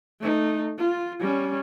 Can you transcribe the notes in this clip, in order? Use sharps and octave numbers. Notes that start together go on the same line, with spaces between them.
A3 D#4
F4
G3 C#4